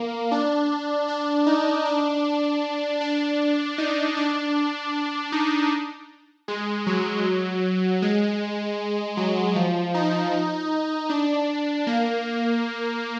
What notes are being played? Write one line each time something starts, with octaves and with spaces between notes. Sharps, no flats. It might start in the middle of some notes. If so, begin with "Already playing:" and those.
Already playing: A#3
D4
D4
D#4
D4
D4
D#4
D4
D#4
G#3
F#3
G#3
F#3
F3
D#4
D4
A#3